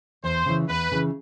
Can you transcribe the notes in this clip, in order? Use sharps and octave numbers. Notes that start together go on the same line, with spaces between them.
E2 C5
C#3 E3
E2 B4
C#3 E3